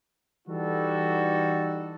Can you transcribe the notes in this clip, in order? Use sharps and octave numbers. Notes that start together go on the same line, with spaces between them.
E3 G3 D#4 F#4 A4